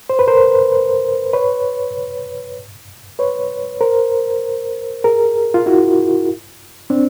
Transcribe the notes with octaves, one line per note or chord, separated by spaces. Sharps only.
C5
B4
A#4 C5
B4 C#5
B4 C#5
A#4 C5
G#4 A#4
F4
E4 F#4
C4 D4